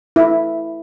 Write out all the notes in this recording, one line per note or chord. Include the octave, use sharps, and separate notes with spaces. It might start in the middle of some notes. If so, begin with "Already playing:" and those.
E4